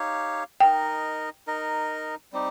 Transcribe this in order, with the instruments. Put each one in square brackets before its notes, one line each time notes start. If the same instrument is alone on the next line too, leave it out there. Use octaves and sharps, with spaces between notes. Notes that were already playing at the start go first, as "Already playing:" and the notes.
Already playing: [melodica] D#4 G4 C#5 F5
[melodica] D#4 A#4 D#5 [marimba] G5
[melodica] D#4 A#4 D#5
G3 C4 D#4 G4